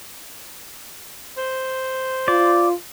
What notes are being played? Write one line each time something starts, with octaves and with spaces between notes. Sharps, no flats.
C5
F4 D5